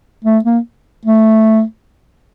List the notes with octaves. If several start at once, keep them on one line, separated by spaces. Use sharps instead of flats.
A3
A#3
A3